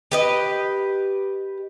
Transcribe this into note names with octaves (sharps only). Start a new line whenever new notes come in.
G4 B4 D#5